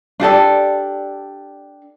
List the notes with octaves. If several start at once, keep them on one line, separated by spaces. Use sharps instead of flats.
D4 G4 A4 D5